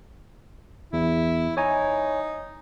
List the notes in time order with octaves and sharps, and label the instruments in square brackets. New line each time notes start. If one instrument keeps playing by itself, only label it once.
[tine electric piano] E2 [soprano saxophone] E4
[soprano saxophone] D#4 [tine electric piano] C#5 G#5 A#5